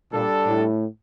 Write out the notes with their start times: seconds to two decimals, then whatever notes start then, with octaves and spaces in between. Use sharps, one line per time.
0.12 A#2 G3 D4 A4
0.46 A2